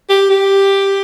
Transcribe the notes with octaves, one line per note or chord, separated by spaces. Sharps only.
G4
G4